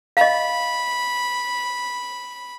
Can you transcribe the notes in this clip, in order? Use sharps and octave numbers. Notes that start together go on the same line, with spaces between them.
D#5 F5 B5